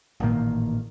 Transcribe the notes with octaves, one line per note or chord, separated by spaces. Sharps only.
A1 A#2 D#3 A#3